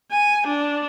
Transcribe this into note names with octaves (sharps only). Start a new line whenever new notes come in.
G#5
D4